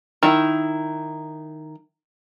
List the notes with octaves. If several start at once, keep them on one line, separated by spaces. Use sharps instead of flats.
D#3 E4